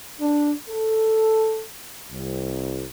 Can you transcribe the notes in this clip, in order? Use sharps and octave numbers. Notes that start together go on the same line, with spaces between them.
D4
A4
C2